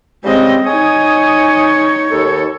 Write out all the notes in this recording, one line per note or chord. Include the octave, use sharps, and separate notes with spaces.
C#3 G3 G#3 C4 D#5
D#4 C#5 D#5 G#5 D#6
D#2 A4